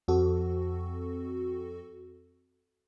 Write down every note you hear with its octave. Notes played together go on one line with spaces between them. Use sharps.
F2 C4 F#4 A4